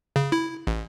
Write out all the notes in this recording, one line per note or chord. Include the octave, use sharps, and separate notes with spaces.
C#3
E4
A1